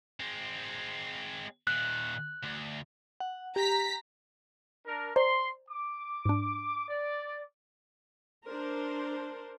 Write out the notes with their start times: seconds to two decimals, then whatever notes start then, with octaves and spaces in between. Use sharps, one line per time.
0.20 G#3 C4
1.67 A#2 D#3 F#6
2.43 D2
3.20 F#5
3.56 G4 A#5 B6
4.86 D4 A#4
5.16 C5 D5 A#5 C6
5.70 D6
6.25 G#2 D4
6.88 D5
8.47 D4 A#4 C5